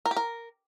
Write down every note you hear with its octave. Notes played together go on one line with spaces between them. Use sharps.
A#4
G4
A#4